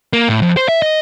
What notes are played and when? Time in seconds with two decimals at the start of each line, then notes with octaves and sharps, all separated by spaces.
0.13 A#3
0.29 A2
0.42 F2
0.57 C5
0.69 E5
0.82 D#5